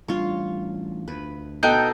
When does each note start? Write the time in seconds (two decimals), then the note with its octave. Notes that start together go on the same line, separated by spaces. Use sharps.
0.08 A1 G3 D4 F4 C#5
1.08 D2 B4
1.63 B2 D#4 A4 G5 A#5 F#6